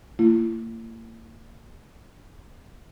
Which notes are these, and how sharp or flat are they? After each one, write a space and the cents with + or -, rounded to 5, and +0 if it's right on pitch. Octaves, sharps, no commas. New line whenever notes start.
A#3 -40 E4 +40